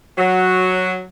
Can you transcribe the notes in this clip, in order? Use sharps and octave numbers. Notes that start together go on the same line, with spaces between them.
F#3